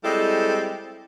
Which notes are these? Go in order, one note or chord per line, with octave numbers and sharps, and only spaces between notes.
G3 G#3 C4 E4 A4